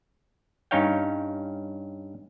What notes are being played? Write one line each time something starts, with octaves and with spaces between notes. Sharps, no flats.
G2 C#4 D#4 C#5 F5 G5